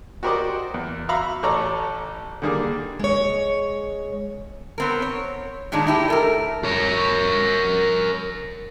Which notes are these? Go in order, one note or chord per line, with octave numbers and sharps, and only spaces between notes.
F#4 G4 A#4 C5 D5 D#5
E2
F#4 E5 F5 A#5 B5
A1 A4 C#5 D5 A#5
D3 D#3 G3 A#3 G#4
G#3 C#5
B3 C4 A#4
C#5
A#2 D#3 G#3 D4 D#4
D#4 E4 G4
A3 A4 A#4
A#4 C#5